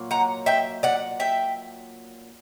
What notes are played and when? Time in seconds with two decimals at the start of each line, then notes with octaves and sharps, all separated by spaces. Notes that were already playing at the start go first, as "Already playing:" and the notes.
Already playing: A#2 F#3 A#3
0.11 F#5 A#5
0.46 E5 G5
0.83 D5 F#5
1.20 E5 G5